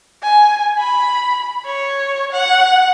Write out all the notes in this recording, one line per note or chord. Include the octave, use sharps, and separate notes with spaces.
G#5
B5
C#5
F#5